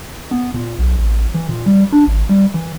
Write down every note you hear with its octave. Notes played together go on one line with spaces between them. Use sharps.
B3
A#2
B1
A1
E3
A#2
G3
D4
G#1
G3
E3